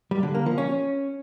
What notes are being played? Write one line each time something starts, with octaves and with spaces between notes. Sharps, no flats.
G3
D3
A#3
F3
C#4